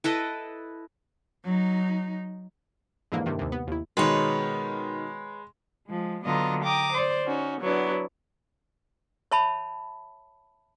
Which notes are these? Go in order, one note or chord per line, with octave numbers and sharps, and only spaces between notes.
E4 A4 B4 D#5
F#3 D#4
F2 G#2 D3 E3 A#3
G2 C3 D#3
D#2 C3
B3
D#2 E4
B2 D#3 G#3 D#4 B4 C#5
F3 G#3
D3 F#3 B3 F4 D#5 A#5
G5 A#5 D6 D#6
C5 D5
C#4 D#4 F#4
F#3 B3 D4 E4
C#5 E5 A5 B5